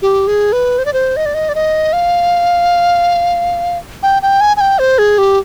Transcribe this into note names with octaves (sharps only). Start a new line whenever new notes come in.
G4
G#4
B4
C5
D5
C5
D#5
D5
D#5
D5
D#5
F5
G5
G5
G#5
G#5
G5
C5
G#4
G4